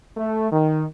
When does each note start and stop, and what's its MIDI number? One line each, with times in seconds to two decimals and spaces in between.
0.17 0.49 57
0.52 0.84 51